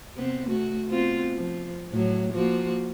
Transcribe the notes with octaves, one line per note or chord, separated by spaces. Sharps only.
C3 B3 C4
A3 F#4
B3 C4 F4
F3
A2 F#3
F3 A#3 F#4